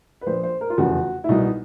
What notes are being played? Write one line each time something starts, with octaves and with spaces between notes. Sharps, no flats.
B4
A#1 A#2 F3 C5
C5
A#4
F4
F1 E2 C#3 F3 F#4
E4
C2 B2 D#4